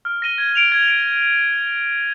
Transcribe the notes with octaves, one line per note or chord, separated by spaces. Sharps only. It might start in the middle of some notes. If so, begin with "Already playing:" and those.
F6
A#6 D#7 G7
G#6
D7 F7
G#6
D7 F7